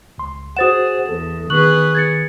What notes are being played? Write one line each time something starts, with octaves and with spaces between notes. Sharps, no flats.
C#2 C6
F#4 G#4 C5 F#5 D#6 A6 E7
E2 A4
D#3 B3 G#4 B4 C#6 F#6 F#7
G#6 A6 C#7